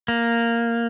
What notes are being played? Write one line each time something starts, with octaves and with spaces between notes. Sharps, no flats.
A#3